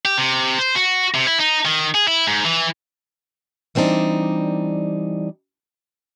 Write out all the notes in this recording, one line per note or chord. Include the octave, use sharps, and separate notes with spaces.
G4
C3
C5
F#4
C3
E4
D#4
D#3
G#4
E4
G#2
E3
E3 G3 C4 D4 D#4